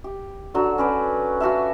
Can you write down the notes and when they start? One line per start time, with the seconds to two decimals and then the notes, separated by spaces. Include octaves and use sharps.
0.04 G4
0.54 D3 F#3 F#4
0.78 C#4 B4 D5
1.40 F4 F#4 A4 E5